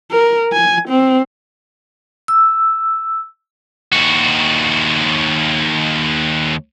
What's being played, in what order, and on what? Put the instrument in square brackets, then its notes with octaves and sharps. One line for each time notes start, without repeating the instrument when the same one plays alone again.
[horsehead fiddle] A#4
G#5
C4
[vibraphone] E6
[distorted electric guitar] D#2 F#4